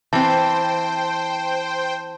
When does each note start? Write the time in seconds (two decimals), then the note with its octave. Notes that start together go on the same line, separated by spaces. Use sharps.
0.13 E3 C4 C5 G5 A5